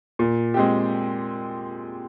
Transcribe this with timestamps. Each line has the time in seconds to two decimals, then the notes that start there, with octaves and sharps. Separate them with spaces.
0.19 A#2
0.54 G#3 C4 G4